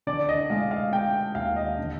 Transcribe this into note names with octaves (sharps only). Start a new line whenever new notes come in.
D3 D5
D#5
G#3 F5
F5
G#3 G5
D#2 F5
D#5
D3